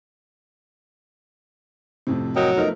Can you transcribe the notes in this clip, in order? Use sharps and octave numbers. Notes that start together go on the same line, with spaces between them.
F2 A2 C3
F#3 A#4 D#5 G5
F3 A3 B3 D#4 A#4 A#5